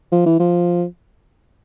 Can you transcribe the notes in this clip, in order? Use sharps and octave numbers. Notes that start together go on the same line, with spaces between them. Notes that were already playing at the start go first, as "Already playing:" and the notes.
F3
E3
F3